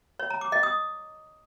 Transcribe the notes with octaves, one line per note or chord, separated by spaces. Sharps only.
C#5
A#5
D6
D#5
D#6